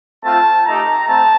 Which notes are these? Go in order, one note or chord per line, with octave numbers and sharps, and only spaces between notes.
A3 C4 F4 A5
A3 D#4 G4 A#5
A3 C4 A5